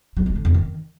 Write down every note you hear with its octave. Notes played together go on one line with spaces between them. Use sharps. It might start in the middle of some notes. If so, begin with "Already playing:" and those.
F#3
G#3
D3
F2
D#3